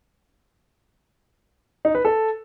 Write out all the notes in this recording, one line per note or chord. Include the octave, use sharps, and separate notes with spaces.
D#4
B4
A4